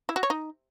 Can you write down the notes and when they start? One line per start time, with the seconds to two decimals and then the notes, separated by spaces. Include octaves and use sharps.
0.09 E4
0.16 F#4
0.23 C#5
0.30 D#4